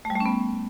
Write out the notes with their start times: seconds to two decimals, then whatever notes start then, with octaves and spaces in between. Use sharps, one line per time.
0.05 A3
0.10 G3
0.15 A3
0.20 C#4
0.26 B3